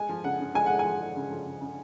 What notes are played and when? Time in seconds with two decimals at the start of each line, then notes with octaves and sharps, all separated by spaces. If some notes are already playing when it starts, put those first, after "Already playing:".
Already playing: G#3 G#5
0.09 F3
0.24 C#3 F#5
0.40 C#3
0.55 G#3 G#5
0.66 G#3 F#5
0.79 G#5
0.85 F3
1.01 G#3
1.16 C#3
1.30 F3
1.47 C#3
1.61 C#3